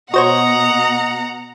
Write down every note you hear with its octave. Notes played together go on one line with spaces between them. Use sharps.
B2 F#4 C5 C#5 D#5 F#5 A#5